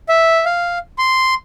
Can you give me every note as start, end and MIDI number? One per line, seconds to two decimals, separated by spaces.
0.09 0.45 76
0.45 0.78 77
0.98 1.34 84